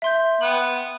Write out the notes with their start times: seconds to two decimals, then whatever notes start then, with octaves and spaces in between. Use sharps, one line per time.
0.02 E5 C6 G6
0.41 B3 G5 F#6 F#7